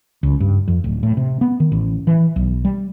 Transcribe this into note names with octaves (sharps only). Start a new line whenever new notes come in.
C#2
G2
F2
D1
A2
C3
B3
D#3
A1
E3
B1
G3